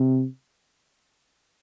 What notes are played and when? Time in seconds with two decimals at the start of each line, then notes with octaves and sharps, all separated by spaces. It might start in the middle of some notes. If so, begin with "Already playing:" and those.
Already playing: C3